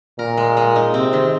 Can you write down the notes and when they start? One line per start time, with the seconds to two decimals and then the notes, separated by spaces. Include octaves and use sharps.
0.19 A#2 A#4
0.37 G#3
0.57 G#3
0.76 D#4
0.94 C3 C4
1.13 D#3